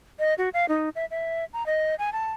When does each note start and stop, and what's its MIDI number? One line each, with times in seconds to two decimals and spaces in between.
0.19 0.34 75
0.38 0.49 66
0.54 0.66 77
0.69 0.89 63
0.95 1.05 76
1.11 1.45 76
1.53 1.66 82
1.66 1.95 75
1.99 2.12 80
2.13 2.33 81